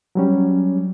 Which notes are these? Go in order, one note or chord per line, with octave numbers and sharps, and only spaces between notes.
F#3 G3 C#4